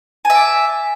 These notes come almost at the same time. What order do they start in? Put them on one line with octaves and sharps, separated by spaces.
G#5 E5 D5